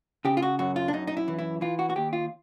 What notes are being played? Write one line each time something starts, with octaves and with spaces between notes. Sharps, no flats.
C#3 G4
F4
F#4
F#2 F#4
F4
D4
F#2 D#4
D#4
E4
E3
E4
E3 F4
F#4
F#4
D#2 G4
F4